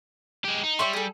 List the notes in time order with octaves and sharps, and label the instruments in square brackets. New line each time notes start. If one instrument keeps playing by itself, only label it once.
[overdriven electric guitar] G#3 G4
D#4
[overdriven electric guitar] G3 [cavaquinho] C#5 E5 C6
[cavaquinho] G#4 A4